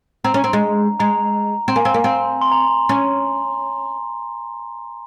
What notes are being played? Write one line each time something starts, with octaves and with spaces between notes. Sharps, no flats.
C4 A#5
C#4
C4
G#3
G#3 A#5
C4
A#3 G#5
C4
A#3
C4
C6
A#5
C#4